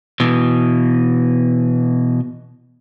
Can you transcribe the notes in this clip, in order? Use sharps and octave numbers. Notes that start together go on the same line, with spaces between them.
B2 E3